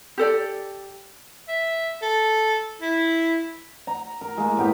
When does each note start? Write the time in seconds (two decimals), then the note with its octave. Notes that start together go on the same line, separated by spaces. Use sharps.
0.18 G4 A4 D5
1.48 E5
2.02 A4
2.81 E4
3.87 A#5
4.21 A#4
4.37 G#3 A#3
4.57 A2 B3 G4